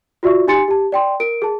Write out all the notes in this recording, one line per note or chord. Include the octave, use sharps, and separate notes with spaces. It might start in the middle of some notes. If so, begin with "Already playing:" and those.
F4 F#4 D5 E5 C#6
D#4 G4 G#5 C6 A6 C#7
G4 A5
D5 G5 C6
A#4 D7
G#4 A5